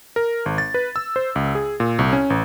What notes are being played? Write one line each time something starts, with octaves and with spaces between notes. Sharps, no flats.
A#4
G#1
A6
B4
E6
C5
C#2
G#4
A#2
C2
C#4
A1